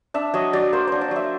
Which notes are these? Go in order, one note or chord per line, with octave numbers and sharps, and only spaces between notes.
D4 E5
F#3 D#5
F#3 D5
A#3 C5
D4 C5
D5
F#3 E5